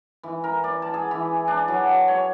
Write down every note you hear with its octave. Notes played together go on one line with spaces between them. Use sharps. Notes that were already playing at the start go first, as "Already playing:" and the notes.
E3
A#4
D5
A5
G#4
E3
D4
F#3
C#5